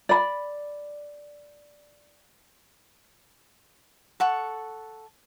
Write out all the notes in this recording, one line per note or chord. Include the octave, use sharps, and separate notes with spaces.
D5 B5
A4 F#5 C#6